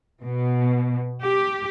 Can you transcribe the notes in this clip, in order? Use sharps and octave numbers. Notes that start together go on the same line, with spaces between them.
B2
G4